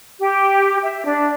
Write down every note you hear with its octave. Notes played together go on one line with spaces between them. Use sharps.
G4
E5
D4